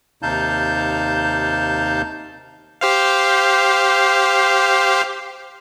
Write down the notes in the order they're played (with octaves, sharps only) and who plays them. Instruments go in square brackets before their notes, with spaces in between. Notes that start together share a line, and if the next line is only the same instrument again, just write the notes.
[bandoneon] D#2 C3 D#4 F5 A5 G6
[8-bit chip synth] G4 C5 F5